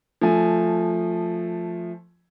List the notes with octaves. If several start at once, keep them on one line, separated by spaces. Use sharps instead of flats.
F3 A3 G#5